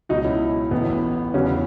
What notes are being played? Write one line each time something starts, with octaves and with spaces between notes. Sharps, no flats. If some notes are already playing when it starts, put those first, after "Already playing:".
C#2 B2 F#3 D#4 F#4
C#4 E4
A1 A2 E3 B3
E2 C#3 F#3 C#4